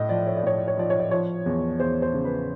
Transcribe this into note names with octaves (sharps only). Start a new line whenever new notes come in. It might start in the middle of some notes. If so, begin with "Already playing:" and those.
Already playing: A2 D#5
F3 D5
C#5
D5
A2 C#5
D5
C#5
F3 D5
C#5
D5
F3 C#5
E2
E2 C5
C5
C#3
B4